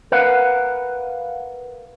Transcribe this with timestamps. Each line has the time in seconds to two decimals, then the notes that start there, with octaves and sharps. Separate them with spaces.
0.12 A#4 B4 F5 F#5